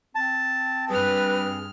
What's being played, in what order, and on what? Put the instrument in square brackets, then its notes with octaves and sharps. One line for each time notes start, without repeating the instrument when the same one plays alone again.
[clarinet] C4 [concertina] A5
[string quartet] G2 F6 [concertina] G#4 [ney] B4